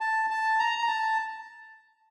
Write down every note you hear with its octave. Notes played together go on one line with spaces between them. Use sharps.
A5
A5
A#5
A#5
A5